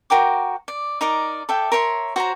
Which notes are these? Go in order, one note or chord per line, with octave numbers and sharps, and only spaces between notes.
F#4 A#4 G5 D6
D5
D#4 A#4 D5 D#5
A4 D5 E5 G5
A#4 C#5 E5 C6
F#4 C5 C#5 A#5